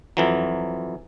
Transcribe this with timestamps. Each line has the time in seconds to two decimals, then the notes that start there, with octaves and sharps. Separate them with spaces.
0.17 F2 E3 F#3